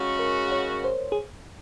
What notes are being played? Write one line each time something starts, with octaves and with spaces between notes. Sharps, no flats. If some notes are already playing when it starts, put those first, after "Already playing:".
Already playing: C#3 G#3 C#4 F#4
A#4
C#5
C5
G#4